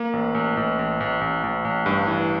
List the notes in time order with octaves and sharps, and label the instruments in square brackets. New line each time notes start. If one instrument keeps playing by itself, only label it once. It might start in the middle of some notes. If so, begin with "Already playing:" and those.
Already playing: [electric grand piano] A#3
A1
A1
A1
A1
A1
A1
A1
A1
G2
E3